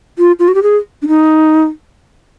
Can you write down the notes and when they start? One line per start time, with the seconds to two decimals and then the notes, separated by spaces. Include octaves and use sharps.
0.18 F4
0.39 F4
0.48 F#4
0.55 G4
0.63 G#4
1.02 D4
1.08 D#4